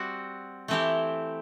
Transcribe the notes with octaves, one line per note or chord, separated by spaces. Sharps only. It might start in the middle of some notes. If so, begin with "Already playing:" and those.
Already playing: G3 C4 F#4
E3 A3 C4 E4 G4